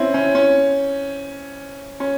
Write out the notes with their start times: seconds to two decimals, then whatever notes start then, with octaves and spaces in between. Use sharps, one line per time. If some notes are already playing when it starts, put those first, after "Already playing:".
Already playing: C4 C#4 E4
0.14 C#4
0.35 C#4
2.00 C#4